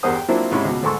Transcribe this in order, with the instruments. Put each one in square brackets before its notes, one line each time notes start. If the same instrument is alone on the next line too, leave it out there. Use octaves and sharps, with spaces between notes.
[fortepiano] E2 G2 A#4 C5 F#5 D#6
G5
F#3 A#3 C4 D4 E4 F4
G#2 C3 C#4 E4 B5
C#2 B2
D2 G#2 A4 C6 C#6 E6